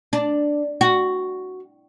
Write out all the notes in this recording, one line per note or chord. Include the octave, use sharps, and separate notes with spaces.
D4
F#4